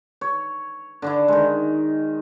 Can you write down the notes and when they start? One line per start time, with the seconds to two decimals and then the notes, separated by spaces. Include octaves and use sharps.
0.21 C#5
1.02 D3 D4 E4
1.28 D#3 G#3